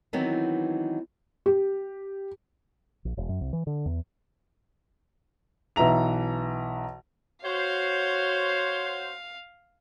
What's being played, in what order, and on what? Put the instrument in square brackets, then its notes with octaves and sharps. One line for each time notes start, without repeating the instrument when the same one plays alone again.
[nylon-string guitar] D#3 E3 F#3 B3 C4 D#4
[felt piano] G4
[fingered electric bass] A#1
E1
F#2
C2
E3
D3
E2
[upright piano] B1 E3 E5 A#5 F7
[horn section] F#4 C5 [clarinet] C#5 [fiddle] F5